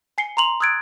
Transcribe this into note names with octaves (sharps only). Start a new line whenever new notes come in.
G#5 C7 C#7 G7
A#5 C6 F7 F#7
D#6 E6 F#6 G#6 A6 D7